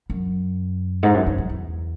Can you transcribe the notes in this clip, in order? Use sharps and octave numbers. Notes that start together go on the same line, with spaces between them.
F#2
G#2
F#2
F#2
F#2
E2